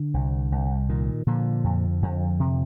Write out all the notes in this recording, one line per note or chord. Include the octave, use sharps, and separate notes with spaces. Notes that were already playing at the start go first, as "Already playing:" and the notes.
Already playing: D3
C2
C2
A#2 D#3
A#2 D3 F3
F2
F2
C3